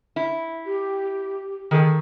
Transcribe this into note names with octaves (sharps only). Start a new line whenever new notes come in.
E4
G4
D#3 G#4 A4